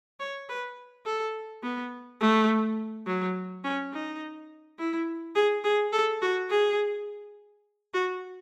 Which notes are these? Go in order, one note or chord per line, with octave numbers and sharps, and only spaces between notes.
C#5
B4
A4
B3
A3
F#3
C#4
D#4
E4
G#4
G#4
A4
F#4
G#4
F#4